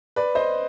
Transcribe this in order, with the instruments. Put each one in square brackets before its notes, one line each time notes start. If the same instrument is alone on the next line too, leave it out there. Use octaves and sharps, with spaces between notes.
[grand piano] B4 D5
C5 D#5